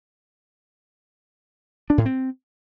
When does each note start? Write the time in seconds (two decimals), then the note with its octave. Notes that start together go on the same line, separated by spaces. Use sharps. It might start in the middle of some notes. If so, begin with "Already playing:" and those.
1.90 D4
1.98 A2
2.06 C4